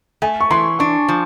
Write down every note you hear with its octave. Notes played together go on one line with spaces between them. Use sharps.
A3 G#5
C#6
E3 C6
D4 C#6
F3